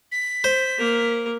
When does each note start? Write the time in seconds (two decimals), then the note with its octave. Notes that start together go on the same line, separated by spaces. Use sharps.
0.12 B6
0.44 C5
0.78 A#3 A#4